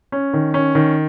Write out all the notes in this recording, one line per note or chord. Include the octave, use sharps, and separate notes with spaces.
C#4
D#3
C#4
D#3